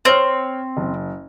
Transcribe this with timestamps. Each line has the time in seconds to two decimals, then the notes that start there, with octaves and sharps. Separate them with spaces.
0.05 C4 C5 C#5 F6
0.77 F#1